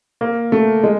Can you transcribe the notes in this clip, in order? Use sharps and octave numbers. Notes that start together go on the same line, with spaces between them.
A#3
A3
G#3